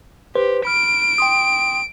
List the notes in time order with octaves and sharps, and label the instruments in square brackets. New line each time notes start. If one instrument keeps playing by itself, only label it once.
[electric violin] G4 [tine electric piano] B4 C5 C6
[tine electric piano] B5 F6 [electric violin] D7
[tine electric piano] G5 C6 D#6